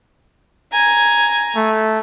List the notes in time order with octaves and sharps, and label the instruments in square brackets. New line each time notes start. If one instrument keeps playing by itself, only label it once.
[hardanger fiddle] G#5 A#5
[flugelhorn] A3